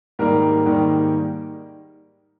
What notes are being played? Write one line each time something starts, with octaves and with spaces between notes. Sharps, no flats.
G#2 D#3 G3 A#3 A#4
G#2 D#3 G3 A#3